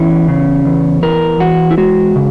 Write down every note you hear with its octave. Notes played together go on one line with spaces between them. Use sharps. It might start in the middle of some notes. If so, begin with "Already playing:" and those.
Already playing: E2 E3 C#4
C#3
E2
E3 A#4
E2 F#4
E4
G#3 F#4
C#3